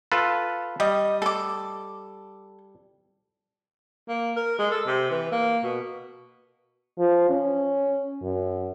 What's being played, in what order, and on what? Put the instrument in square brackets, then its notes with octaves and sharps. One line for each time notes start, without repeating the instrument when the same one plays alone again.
[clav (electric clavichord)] F4 A4 B4
[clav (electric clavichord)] G3 [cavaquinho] D#5
[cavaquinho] A4 D6
[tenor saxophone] A#3
A#4
G#3
A4
C3
E3
A#3
B2
[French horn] F3
C#4
F#2